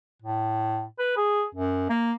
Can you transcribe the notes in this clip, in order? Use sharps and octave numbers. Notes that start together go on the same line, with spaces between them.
A2
B4
G#4
F#2
A#3